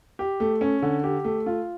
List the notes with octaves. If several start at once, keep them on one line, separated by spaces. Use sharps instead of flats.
G4
A3
C#4
D3
G4
A3
F4